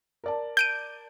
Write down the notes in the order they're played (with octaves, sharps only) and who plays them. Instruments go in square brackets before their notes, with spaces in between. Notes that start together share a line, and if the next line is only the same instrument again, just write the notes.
[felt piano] A#4 D5 A5
[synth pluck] G6 D7 D#7